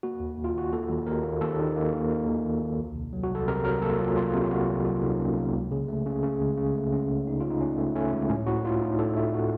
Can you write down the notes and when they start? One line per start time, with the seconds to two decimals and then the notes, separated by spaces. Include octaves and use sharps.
0.03 A#3 F#4
0.20 D#2
0.38 D#2
0.44 F4
0.54 D#3 F#4
0.72 D#2 A4
0.89 D#2
1.06 D#2 A#4
1.24 A#3
1.41 D#2 A4
1.59 D#3
1.76 A#3
1.93 D#3
2.10 A#3
2.27 D#3
2.44 D#2
2.61 D#2
2.79 C2
2.95 C3
3.13 F#3
3.24 F#4
3.30 C2 A4
3.47 C3 A#4
3.65 F#3 A#4
3.82 A#3 A4
3.99 F#3 F4
4.16 F#3 F4
4.34 C3
4.44 F4
4.51 C2 F#4
4.69 C3
4.85 F#3 F#4
4.96 F4
5.02 C2 D#4
5.19 A#3 C#4
5.37 A#3
5.54 C#2
5.71 C#3
5.88 A3
6.06 C#3
6.23 C#3
6.41 C#2
6.57 C#3
6.76 A3
6.92 C#2 C#4
7.10 C#2
7.27 C#2 D#4
7.40 C#3 F4
7.50 D#4
7.61 C#2 C#4
7.78 A3
7.96 A3 C#4
8.13 C#2
8.29 A2 C#4
8.47 A2 F#4
8.65 A2 F4
8.81 A2 D#4
8.99 A3 A4
9.16 A3
9.33 A3 F#4